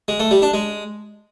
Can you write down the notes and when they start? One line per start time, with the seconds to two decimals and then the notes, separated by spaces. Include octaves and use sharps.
0.08 G#3
0.20 A3
0.31 G3
0.42 D4
0.54 G#3